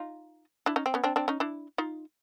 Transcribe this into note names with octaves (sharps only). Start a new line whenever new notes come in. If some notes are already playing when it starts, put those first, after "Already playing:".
Already playing: D#4 F4
D4 E4
C#4 D#4
C4
B3 C#4
C4 D4
C4 D4
C#4 D#4
D4 E4
D#4 F4